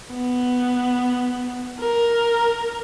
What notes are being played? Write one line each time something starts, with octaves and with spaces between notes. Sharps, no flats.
B3
A#4